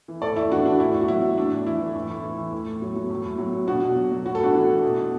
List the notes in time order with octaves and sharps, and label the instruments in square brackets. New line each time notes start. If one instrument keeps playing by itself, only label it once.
[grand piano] E3
A2 A4 D5
A2 E4
E3 D4 F#4
E3 D4
A2 E4
A2
F#4
F#3 E4
F#3
A2 D4
A2
E3 E4
E3
A2
A2
E3
E3
A2
A2
F#3
F#3
A2
A2
F#3
F#3
B2 D4 F#4
B2
F#3
F#3
A2 F#4
A4
A2 D4 F#4
E3
E3
B2
B2